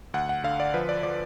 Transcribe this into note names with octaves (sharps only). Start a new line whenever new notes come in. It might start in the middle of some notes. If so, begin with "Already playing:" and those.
D2 F#5
F#5
D3 F5
D5
F3 B4
D5
F3 D5